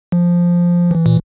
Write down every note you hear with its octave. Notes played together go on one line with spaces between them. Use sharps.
F3
E3
A#2